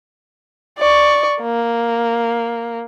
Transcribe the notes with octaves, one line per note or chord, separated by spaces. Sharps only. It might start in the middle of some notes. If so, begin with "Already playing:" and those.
D5 C#6
A#3